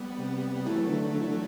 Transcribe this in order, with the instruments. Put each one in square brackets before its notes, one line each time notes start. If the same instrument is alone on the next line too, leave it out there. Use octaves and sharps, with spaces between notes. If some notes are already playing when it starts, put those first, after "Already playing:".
Already playing: [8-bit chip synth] G3 B3
[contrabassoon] C3
[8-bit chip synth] G3
[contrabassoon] E3 [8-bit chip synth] F#3 A3
[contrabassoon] D3
D3
E3
D3